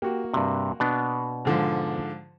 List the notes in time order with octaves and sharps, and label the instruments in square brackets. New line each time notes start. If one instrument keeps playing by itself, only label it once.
[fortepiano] A#3 F#4 [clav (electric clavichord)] G4
[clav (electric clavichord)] G2 C3
B2 B3 D4
[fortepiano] G#2 D3 F3